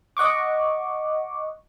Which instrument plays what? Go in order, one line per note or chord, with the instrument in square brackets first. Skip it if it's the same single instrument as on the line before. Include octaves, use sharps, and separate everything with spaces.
[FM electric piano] D#5 F#5 C#6 D6